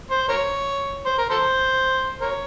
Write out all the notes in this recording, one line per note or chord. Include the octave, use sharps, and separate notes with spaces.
C5
A#4 C#5
C5
A#4
A4 C5
A#4 C#5